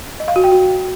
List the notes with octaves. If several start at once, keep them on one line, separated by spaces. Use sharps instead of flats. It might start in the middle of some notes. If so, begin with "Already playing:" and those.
D#5
F5
F#4
G5
F#4